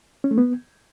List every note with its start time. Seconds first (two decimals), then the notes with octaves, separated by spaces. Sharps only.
0.24 C#4
0.31 A3
0.38 B3